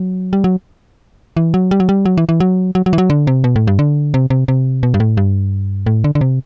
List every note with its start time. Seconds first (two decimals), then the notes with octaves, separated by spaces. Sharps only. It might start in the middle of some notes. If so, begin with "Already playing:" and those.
Already playing: F#3
0.33 G3
0.44 F#3
1.37 E3
1.54 F#3
1.71 G3
1.80 F#3
1.89 G3
2.05 F#3
2.17 E3
2.29 E3
2.40 F#3
2.75 F#3
2.86 F#3
2.93 E3
2.98 F#3
3.10 D3
3.27 C3
3.44 B2
3.56 A2
3.67 G2
3.79 D3
4.14 C3
4.30 C3
4.48 C3
4.83 B2
4.94 G2
5.00 A2
5.17 G2
5.86 A2
6.04 D3
6.15 D3
6.21 C3